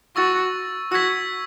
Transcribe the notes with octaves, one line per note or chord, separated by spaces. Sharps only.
F#4 C#6 E6 A6
F#4 E6 G#6 B6